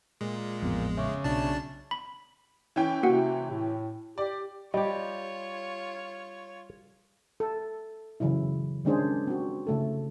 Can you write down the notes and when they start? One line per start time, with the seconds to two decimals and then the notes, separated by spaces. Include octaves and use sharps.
0.21 A#2 G#3
0.62 A1 F2 F3 B3 C4
0.97 C#3 E5 C#6 D6
1.24 B1 B2 B3 D4 A5
1.91 B5
2.76 E3 C#4 G5
3.03 C3 A#3 F#4 F#5
3.50 A2
4.18 G4 D5
4.74 G3 F4 G4 C#5 D#5
7.40 A4
8.20 C#3 E3 F#3 E4
8.85 D#3 G#3 C#4 D4 G#4 C5
9.27 C4 F#4
9.67 C#3 A3 A4